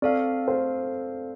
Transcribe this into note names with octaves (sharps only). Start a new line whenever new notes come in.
C4 A4 D5 F5
C5